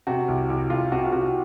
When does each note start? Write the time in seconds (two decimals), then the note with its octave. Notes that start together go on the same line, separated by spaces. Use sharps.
0.07 C3 F#4
0.28 C2
0.50 C2
0.70 C2 F4
0.92 C3 F#4
1.05 F4
1.12 C3 F#4